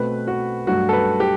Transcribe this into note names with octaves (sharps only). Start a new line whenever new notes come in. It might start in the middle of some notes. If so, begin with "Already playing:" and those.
Already playing: B2 A3 C4 B4
F#4
G2 F#3 A3 F#4
A4
B4
G4